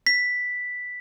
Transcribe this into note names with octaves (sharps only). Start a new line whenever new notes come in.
B6